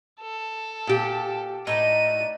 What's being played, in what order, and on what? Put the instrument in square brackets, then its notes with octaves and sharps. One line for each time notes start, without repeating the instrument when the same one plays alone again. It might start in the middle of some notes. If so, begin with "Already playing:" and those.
[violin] A4
[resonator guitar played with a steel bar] A#2 G4
[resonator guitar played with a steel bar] A2 [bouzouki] D#4 B4 D5 [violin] D#7